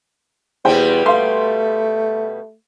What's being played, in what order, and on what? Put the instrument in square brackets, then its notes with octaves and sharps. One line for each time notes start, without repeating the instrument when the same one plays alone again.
[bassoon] E2 [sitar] B2 G3 B3 [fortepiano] C5 G5
[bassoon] A3 [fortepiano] F5 C6